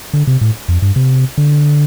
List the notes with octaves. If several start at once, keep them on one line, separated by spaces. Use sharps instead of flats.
D3
C3
A2
F2
G2
C3
D3